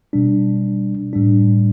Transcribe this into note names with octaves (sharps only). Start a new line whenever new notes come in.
B2 G3 D4
A2 G3 D4